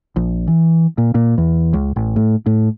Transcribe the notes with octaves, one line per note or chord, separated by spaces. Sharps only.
A#1
E3
A#2
A#2
E2
C#2
A1
A2
A2